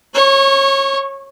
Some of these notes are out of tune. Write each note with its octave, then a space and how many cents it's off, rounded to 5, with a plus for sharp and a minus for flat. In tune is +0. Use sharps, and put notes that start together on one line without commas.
C#5 -25 C#6 +0